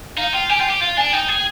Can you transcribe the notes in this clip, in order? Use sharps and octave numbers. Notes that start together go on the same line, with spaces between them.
D#4 F5
F4 G5
G4 G#5
F4 G5
G4
F4 F5
D4 G#5
D#4 G5
G#4